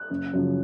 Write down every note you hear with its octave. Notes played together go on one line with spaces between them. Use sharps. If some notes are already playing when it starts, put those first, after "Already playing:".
Already playing: F#6
F#1
F#2 C#3 F3